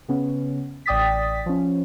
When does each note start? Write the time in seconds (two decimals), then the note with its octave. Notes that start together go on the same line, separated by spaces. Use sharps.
0.08 C#3 B3 C#4
0.86 A1 D5 G5 D#6 A6 B6
1.46 F3 C#4